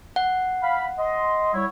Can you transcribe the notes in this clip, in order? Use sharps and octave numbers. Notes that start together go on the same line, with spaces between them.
F#5
F5 B5
D#5 C6
G3 E4 C#5